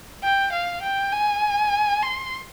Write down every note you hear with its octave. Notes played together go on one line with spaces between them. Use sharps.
G5
F5
G5
G#5
C6